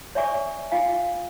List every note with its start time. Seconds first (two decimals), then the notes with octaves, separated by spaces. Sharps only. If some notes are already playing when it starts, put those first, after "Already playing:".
0.15 C#5 D5 E5 G#5 C#6 D#6
0.71 F4 F5 G#5